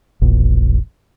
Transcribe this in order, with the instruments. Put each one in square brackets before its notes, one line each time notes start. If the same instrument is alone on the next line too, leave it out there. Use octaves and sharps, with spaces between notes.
[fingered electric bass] E1 A#1